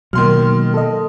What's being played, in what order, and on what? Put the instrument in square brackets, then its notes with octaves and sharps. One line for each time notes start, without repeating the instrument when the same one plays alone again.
[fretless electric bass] B2 A#3 [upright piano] D#3 C6 F6 [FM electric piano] F#3
[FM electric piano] A4 D#5